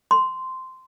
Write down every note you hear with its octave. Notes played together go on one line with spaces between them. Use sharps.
C6